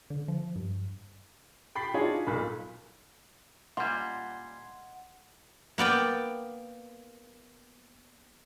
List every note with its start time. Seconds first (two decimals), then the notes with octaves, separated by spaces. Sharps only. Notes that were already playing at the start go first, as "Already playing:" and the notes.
0.10 D3
0.28 F3
0.56 G2
1.75 G5 B5 A6 B6 C7
1.94 D4 D#4 F4 F#4 G#4 C#5
2.27 B1 A#2 B5
3.77 A#2 G3 F#5 C6 G#6
5.78 A#3 B3 D5 G5